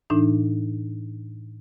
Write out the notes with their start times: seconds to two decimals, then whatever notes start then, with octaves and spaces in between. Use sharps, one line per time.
0.10 A2 E3 D4 D#4